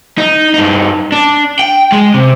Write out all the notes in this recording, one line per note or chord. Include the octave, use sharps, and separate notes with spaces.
D#4
G2 D#4
D4
G5
G#3
C3